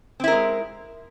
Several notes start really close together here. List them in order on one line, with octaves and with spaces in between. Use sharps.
C4 E4 A#4 G#3